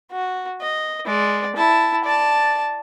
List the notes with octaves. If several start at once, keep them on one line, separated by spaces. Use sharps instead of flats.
F#4
D#5
G#3 D5
E4 A5
D5 A5